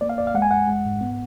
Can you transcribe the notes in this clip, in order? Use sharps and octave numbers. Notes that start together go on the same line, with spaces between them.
A#3 D5
F5
F2 D5
F5
G#3 F#5
G#5
F2 F#5
G#3
G#2
B3